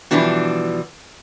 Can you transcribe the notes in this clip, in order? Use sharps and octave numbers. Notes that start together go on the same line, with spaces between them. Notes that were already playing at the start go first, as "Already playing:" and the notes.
B2 E3 F3 G3 D4